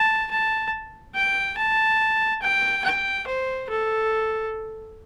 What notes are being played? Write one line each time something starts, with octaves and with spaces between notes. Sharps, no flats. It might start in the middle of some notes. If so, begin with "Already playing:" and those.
Already playing: A5
A5
G5
A5
G5
G5
C5
A4